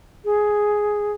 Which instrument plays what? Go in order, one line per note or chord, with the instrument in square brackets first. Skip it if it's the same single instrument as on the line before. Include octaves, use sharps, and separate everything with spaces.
[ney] G#4